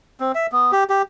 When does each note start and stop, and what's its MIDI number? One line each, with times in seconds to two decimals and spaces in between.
0.20 0.32 60
0.35 0.47 76
0.52 0.71 59
0.72 0.84 67
0.90 1.02 67